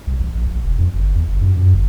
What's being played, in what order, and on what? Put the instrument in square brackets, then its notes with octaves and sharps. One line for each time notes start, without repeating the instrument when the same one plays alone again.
[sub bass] C2
A1
A#1
A#1
E1
F2
G1
E2
G1
F#2
F#2
G1